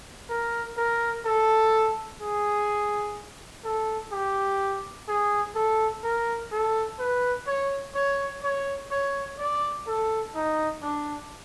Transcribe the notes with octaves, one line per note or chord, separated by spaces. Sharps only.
A#4
A#4
A4
G#4
A4
G4
G#4
A4
A#4
A4
B4
C#5
C#5
C#5
C#5
D5
A4
D#4
D4